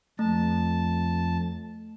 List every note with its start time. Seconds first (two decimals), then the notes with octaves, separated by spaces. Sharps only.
0.19 F2 A3 A5